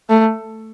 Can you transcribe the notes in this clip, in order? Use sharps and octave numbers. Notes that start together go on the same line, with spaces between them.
A3